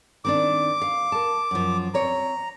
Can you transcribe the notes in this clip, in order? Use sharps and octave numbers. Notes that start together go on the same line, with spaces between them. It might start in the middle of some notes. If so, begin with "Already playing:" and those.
D#3 C4 D4 D6
F5
A#4 A5
F#2 F3
C4 C#5 A#5